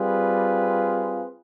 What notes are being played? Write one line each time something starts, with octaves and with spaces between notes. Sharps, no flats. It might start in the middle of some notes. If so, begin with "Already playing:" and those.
Already playing: G3 C4 F4 G#4 B4